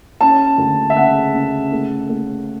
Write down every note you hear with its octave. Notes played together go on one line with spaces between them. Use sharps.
C#4 A5
D2
E5
C#3 F#5
C#3
A3
A3